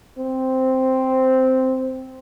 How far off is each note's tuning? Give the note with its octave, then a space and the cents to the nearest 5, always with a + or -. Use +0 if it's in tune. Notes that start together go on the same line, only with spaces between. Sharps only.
C4 -5